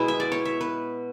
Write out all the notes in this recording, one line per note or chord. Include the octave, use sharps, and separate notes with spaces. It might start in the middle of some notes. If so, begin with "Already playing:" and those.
Already playing: B2 G#3 B3 E4
E5
D5
C#5
E5
B4